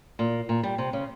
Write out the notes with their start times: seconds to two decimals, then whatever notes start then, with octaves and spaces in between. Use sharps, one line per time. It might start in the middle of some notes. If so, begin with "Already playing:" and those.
0.19 A#2
0.49 A#2
0.63 G3
0.78 C3
0.93 C#3